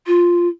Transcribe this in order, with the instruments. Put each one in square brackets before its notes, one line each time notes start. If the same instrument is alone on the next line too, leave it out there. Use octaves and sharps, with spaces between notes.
[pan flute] F4